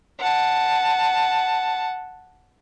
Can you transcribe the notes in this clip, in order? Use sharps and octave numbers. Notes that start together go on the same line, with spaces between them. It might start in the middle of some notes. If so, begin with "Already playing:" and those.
F#5 A5